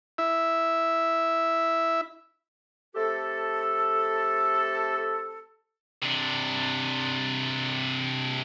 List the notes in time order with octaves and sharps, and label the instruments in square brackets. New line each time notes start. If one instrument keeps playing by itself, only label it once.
[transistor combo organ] E4 E5
[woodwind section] A3 C4 G4 A4
[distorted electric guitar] C3 D4